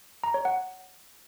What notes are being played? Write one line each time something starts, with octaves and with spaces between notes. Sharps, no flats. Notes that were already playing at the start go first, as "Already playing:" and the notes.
A#5
C#5
F#5